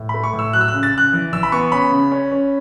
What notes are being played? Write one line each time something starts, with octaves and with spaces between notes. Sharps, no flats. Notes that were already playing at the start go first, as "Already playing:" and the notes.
Already playing: A2
A3 B5
C#6
A2
E6
F#3 F#6
E6
F#6
C#3
A6
C#3 F#6
E3
E3 E6
B5
B3 C#6
C#4 B5
C#3
C#4
C#4